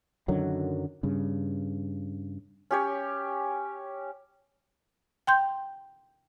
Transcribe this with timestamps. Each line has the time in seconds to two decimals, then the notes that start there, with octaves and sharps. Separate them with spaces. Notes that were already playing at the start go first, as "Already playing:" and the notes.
0.28 F#2 D3 D#3 F#3
1.03 G2 C#3
2.71 C#4 G4 C#5
5.27 G5 C6 G6